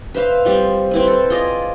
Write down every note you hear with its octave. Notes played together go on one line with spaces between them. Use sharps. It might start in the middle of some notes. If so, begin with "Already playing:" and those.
B4 C5 E5 F5
F3 G3 C4
C4 E4 B4
A4
F4 G#4 D5 D#5